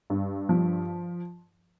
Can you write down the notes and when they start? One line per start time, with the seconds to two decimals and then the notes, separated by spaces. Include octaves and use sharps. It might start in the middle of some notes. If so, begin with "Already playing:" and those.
0.10 G2
0.49 F3